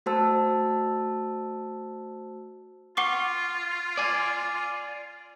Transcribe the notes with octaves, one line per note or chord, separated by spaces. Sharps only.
A3 F#4 C5 A5 E6
F4 F#5 C#6 D6
D5 G#5